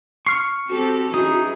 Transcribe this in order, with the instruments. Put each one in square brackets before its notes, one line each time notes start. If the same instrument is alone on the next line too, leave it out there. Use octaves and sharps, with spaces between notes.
[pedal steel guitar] C#6 F6 [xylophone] C7
[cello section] C4 G4 A4 [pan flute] F#4
[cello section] E3 C#4 G#4 [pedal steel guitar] D#4 [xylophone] D#6